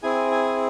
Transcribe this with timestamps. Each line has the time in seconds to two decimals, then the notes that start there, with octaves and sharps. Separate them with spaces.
0.03 C4 E4 G#4 G#5
0.31 G#5